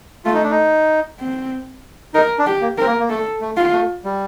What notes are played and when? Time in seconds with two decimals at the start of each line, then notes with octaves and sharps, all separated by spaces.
0.25 A3 F4
0.34 D#4
0.43 D4
0.51 D#4
1.20 C4
2.14 D#4 A#4
2.38 D4
2.47 G4
2.61 A#3
2.78 C4 A#4
2.86 A#3
3.00 A#3
3.09 A3 A4
3.41 A3
3.57 F4
3.72 A3
4.04 G3